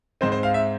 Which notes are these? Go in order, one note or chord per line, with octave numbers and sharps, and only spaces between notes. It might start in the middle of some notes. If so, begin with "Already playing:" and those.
G#2 G#3 C4 C5
C5
F5
E5